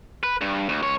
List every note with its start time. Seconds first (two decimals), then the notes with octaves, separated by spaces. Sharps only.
0.23 B4
0.41 G2
0.69 D2
0.82 C#2 C#5